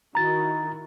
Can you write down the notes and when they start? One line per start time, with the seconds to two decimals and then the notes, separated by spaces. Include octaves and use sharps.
0.15 D#3 E4 F#4 A#5 A6